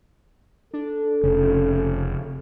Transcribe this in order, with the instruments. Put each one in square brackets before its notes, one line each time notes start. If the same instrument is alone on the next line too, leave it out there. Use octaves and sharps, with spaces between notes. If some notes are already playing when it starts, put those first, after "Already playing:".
[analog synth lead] D4 [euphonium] A4
[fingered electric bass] F1 [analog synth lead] C#3